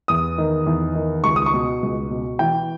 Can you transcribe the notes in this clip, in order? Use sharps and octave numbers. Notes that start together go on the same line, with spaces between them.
E2 D#6
D#3
E2
D#3
C#2 C#6
D#6
C#6
B2
C#2
B2
E3 G5